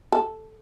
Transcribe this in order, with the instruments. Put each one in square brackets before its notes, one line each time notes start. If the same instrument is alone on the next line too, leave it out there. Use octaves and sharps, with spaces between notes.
[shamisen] A4